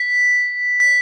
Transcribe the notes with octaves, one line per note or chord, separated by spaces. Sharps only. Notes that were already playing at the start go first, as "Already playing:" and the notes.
Already playing: B6
B6